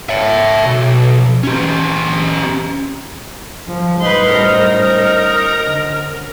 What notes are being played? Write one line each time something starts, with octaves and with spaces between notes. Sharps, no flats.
C#5 E5
B1
C#4 G4
F3
A2 G3 D#4 B4 C6
F#2 A4 A#4 C5
D3